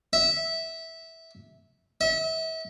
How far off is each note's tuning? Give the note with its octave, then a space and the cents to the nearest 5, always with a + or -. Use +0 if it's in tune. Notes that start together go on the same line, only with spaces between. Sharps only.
E5 -15
E5 -35